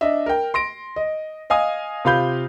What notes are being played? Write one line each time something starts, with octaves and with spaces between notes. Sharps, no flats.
D4 D#5 E5
A#4 G5
C6 A#6 D7
D#5
D#5 F5 G#5 D#6
C3 F4 F5 B5 G6